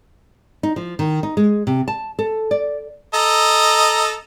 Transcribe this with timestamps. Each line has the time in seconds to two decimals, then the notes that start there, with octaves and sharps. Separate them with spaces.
0.63 D#4
0.76 F3
0.99 D#3
1.23 D#4
1.37 G#3
1.67 C3
1.88 A5
2.19 A4
2.51 D5
3.14 A4 D#5 A#5